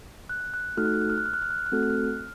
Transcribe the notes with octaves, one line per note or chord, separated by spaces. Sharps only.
F#6
F#6
A3 D#4 F#4 A4 F6
F#6
F6
F#6
F6
F#6
F6
F#6
F6
F#6
F6
F#6
A3 C4 F#4 A4 F6
F#6
F6